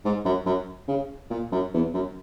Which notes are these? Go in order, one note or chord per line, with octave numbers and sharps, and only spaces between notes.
G#2
F#2
F#2
C#3
A#2
F#2
E2
F#2